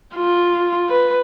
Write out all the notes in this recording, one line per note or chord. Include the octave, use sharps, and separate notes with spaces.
F4
B4